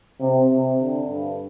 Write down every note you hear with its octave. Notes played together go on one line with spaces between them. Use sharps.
C3
C3
D3
G2